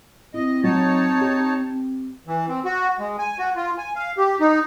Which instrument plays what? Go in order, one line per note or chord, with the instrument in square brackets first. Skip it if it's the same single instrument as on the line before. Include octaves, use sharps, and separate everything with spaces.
[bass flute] C4 [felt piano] E4 [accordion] D#5
[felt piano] F#3 [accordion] D#4 C#5 A5
[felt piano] G4
[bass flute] C4
[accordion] E3
C4
F#4
G#3
G#5
F#4
F4
G#5
F5
G4
D#4